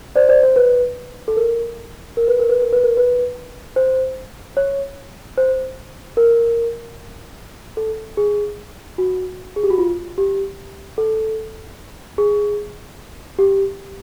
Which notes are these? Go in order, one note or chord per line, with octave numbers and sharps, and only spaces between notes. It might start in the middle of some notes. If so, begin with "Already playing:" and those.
C5 D5
C5 D5
C5
B4
A4
A#4
A#4
B4
A#4
B4
A#4
B4
A#4
B4
C5
C#5
C5
A#4
A4
G#4
F#4
G#4
G4
F#4
F4
G4
A4
G#4
G4